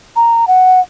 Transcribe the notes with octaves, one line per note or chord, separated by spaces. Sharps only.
A#5
F#5